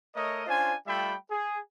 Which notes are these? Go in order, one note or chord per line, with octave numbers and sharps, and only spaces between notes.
A3 A#4 C#5 D#5
C#4 D4 F4 C5 G#5
G3 A3 F4 E5 G5 B5
G#4